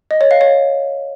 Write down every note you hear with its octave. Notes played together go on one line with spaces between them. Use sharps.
D#5
C#5
F5
C#5